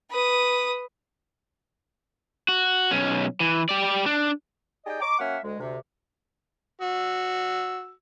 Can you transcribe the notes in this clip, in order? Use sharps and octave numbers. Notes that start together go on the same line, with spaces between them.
B4 D#6
F#4
B1 C#4
E3
G4 D5
D4
D#4 G4 G#4 D5 D#5 G5
D#5 A#5 C#6 D6
F#3 A#3 C#4 E5 F#5 F6
D2 G#3
D2 C3
F#4 E6